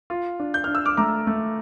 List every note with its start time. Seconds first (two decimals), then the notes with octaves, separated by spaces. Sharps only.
0.10 F4
0.40 D4
0.54 G6
0.64 D4 F6
0.75 E6
0.86 D6 F6
0.97 A3 A#5 D6
1.27 A3